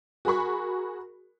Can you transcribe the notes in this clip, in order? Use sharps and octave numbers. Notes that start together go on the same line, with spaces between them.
F#4 G#4 A#4 B5 C#6